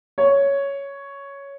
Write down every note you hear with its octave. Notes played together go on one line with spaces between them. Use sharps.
C#5